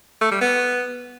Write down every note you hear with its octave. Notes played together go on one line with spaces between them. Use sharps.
A3
G3
B3